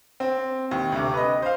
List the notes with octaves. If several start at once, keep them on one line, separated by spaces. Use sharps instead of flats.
C4
D#2
D2 C3
B4 D#5
C5 F5